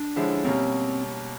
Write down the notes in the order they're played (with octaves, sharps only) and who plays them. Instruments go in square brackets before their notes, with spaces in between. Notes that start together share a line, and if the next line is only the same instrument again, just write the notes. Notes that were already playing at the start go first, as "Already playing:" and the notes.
Already playing: [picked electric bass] D4
[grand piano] D3 F3 G#3 C#4 E4
[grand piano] B2 G3 A#3 C#4 [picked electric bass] C4